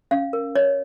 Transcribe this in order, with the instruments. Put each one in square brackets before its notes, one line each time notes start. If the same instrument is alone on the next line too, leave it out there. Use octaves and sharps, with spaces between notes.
[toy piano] C#4 F5
A#4
C#5 D#5